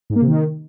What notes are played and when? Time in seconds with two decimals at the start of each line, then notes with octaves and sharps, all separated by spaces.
0.10 G#2
0.16 A#3
0.22 C3
0.28 D#3